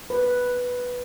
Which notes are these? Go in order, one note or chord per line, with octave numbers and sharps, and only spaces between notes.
B4